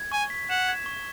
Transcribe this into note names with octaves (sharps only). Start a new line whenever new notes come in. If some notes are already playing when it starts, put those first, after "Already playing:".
Already playing: G#6
G#5 C#6
B6
F#5 E7
G#6
C#6